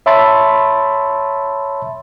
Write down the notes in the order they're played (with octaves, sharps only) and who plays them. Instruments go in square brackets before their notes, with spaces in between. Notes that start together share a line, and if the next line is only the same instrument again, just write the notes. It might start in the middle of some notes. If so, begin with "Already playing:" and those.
[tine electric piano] C#5 E5 A5 B5 C6 A6